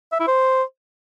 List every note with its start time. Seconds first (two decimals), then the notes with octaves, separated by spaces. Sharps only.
0.12 E5
0.19 E4
0.27 C5